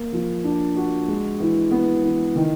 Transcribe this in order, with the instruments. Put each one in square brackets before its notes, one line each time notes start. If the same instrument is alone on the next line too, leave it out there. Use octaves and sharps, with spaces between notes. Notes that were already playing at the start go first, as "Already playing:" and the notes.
Already playing: [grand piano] A#3
F3
D4
F#4
G#3
E3
B3
E3
D#3